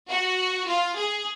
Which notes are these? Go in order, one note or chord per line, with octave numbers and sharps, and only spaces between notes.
F#4
F4
G#4